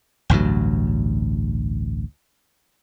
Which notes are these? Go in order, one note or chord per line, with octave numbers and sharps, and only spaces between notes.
A1 D2 G2 F#3